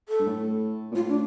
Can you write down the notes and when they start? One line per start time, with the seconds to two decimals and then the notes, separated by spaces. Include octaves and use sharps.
0.09 A4
0.19 G2
0.26 A2
0.91 A#2
0.95 A2 F4
1.09 D4